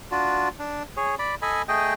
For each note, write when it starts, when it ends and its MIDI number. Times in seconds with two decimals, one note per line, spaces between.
0.11 0.49 62
0.11 0.49 65
0.11 0.49 66
0.59 0.83 62
0.97 1.15 68
0.97 1.15 73
1.19 1.35 74
1.19 1.35 83
1.42 1.62 69
1.42 1.62 75
1.42 1.62 80
1.42 1.62 83
1.68 1.94 57
1.68 1.94 68
1.68 1.94 75
1.68 1.94 79